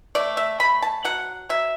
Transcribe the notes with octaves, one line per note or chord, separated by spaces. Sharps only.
A3 D5
E5
A3 B5
A5
F#3 F#5
F#3 E5